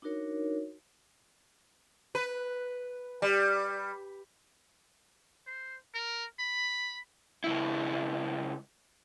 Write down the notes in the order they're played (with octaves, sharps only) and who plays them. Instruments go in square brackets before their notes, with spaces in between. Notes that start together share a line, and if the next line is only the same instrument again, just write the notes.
[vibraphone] D4 D#4 F#4 A#4 C#5
[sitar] B4
G3
[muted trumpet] C5
A#4
B5
[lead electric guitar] C#2 E4